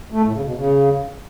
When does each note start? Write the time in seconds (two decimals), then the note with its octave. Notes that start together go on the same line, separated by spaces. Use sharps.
0.12 A3
0.23 A2
0.34 C#3
0.45 B2
0.56 C#3